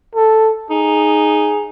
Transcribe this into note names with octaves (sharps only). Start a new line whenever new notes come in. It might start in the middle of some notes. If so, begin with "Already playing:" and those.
A4
D#4 G#4